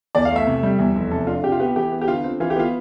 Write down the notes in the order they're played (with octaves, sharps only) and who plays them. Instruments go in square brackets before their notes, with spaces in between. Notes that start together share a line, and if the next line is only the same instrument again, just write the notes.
[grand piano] E2 D5
F5
A3
E5
C3
G3
E2
F1
C3 A4
D4 F4
C3 G4
F4
B3 G4
E3 G4
B3
G4
D3 F4
C4
E3 F4
G4
B3 F4